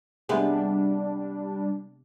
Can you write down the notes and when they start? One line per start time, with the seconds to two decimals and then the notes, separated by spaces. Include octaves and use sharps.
0.29 C3 G3 G#3 B3 D4